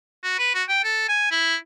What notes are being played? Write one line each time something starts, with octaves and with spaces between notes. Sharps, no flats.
F#4
B4
F#4
G5
A4
G#5
E4